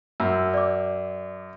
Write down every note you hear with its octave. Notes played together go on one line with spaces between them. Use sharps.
F#2 E6
D5 D6